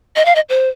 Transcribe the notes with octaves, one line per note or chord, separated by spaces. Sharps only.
D#5
F5
D#5
C5